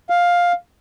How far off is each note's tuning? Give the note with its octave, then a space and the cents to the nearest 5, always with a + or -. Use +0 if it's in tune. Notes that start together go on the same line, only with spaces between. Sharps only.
F5 +10